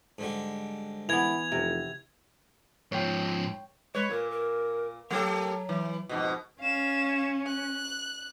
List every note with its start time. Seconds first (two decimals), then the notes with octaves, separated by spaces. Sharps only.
0.18 G#2 D3 G3
1.09 E3 B3 E4 G#6 F7
1.52 F1 C3
2.92 G#2 F3 C#5 G5
3.95 G#3 B4 C#5
4.11 A#2 A#4
4.31 A#4
5.10 F#3 A3 G4 A4
5.69 E3
6.09 F2 G#2 B2
6.61 C#4 F5 E7
7.47 F#6